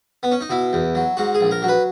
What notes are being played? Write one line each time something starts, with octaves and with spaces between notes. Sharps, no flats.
B3
C#4
D#4
B2 E4
E2
F#3
G#2 F#4
G#4
A#1
A#4
F#3
B4